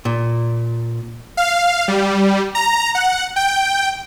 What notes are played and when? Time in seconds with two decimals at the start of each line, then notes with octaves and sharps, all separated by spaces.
0.05 A#2
1.37 F5
1.88 G3
2.55 A#5
2.95 F#5
3.36 G5